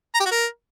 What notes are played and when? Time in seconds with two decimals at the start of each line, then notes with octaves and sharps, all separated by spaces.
0.15 A#5
0.20 G4
0.26 F#4
0.31 A#4